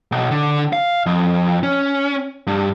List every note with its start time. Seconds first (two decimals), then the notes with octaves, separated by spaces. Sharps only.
0.12 B1
0.31 D3
0.73 F5
1.06 F2
1.63 C#4
2.47 G2